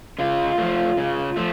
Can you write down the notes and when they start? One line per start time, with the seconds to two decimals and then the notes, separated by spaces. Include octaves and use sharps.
0.19 C#3 F4
0.58 F3 A3
0.97 C#3
1.37 F3 A3